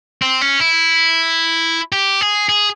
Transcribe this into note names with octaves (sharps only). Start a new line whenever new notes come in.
C4
C#4
E4
G4
G#4
G#4